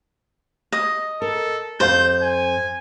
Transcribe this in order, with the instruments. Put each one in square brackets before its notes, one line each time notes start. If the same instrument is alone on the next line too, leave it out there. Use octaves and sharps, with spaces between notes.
[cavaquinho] D#5
[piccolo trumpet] A4 [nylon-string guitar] A#4
[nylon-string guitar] F2 F5 [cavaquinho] C5 [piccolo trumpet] G6
[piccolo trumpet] G#5